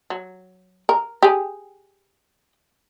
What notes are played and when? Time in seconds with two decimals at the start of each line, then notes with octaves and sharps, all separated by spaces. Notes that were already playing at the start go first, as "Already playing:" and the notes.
0.10 F#3
0.89 A#4
1.22 G4 G#4